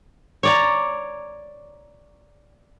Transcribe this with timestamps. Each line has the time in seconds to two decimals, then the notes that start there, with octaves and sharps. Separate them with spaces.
0.43 C#5 D5 A#5